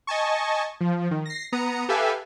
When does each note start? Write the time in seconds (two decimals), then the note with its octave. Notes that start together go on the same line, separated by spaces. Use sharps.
0.07 D#5 G#5 A5 C#6
0.81 F3
1.11 D#3
1.26 A#6 C7
1.52 B3 A#5 D#6 C#7
1.89 G4 A4 B4 E5 F5 G#5